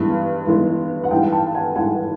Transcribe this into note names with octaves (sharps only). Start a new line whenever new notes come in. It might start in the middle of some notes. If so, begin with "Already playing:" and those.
Already playing: G2 E3 G#3 B3
G2 E3 G#3 B3
F#5
G2 E3 G#3 F5 G5
G5 A5
F#5 G#5
G2 E3 G#3 F#5 G#5